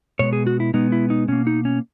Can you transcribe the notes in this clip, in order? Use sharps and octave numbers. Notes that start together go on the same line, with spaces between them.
B2 G#3 B3 C#5
G#4
F#4
E4
B2 G#3 B3 D#4
E4
D#4
B2 A#3 C#4
D#4
C#4